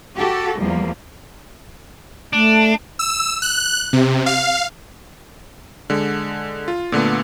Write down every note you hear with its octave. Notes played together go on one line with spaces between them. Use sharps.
F#4 G4 A4
E2 F3 G3 A#3
A3 D4
E6
F#6
C3
F5
D3 G#3
F4
A#2 D3 A3 B3